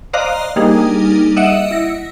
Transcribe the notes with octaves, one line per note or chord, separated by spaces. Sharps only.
C5 D5 D#5 F5 A#5 F#6
G3 A#3 D4 D#4 G#4
D#5 E5 F#5 C#7 D7
E4 A#6